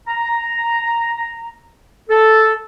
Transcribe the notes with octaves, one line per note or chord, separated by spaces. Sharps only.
A#5
A4